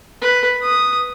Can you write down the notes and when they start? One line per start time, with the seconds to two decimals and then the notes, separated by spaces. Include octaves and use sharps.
0.21 B4
0.62 D#6